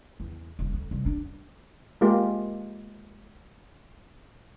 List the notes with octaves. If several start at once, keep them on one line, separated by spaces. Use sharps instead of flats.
E2
D#1
D2
C2
D4
G#3 A#3 F4 G4